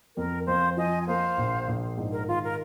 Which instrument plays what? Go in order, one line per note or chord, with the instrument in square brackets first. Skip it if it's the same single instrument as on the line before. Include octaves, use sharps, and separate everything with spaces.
[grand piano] F2 [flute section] A#4
[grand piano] F2 [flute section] C5 F5
[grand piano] F3 [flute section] D#5 G#5
[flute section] G#5
[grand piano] A#3 [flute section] C5 F5
[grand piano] A#1
A#1
G#2
[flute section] A#4
[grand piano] D#3 [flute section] F4
[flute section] A#4